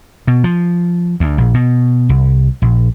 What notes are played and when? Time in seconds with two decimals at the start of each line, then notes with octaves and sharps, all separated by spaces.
0.27 B2
0.44 F3
1.20 D2
1.38 A#1
1.54 B2
2.09 C2
2.62 A#1